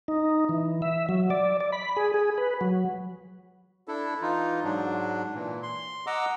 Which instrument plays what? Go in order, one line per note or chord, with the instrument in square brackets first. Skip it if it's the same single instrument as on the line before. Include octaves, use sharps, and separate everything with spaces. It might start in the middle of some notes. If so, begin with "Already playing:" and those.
[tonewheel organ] D#4
E3
E5
F#3
D5
D5
B5
G#4
G#4
B4
F#3
[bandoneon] D4 E4 A4
E3 D#4 F4
G#2 F#3 D4
A#2 E3
C6
D#5 F#5 A#5 D6 E6